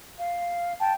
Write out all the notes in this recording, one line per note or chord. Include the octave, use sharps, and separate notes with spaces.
F5
G5 A5